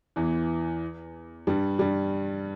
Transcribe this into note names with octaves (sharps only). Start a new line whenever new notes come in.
E2 E3
G2 G3
G2 G3